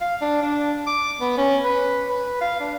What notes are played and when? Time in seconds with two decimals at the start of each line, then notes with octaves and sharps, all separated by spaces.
0.01 F5
0.21 D4
0.42 D4
0.87 D6
1.21 B3
1.38 C#4
1.64 B4
2.09 B4
2.41 F5
2.61 D4